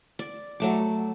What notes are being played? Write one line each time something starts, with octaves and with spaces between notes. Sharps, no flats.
D5
F#3 A3 D6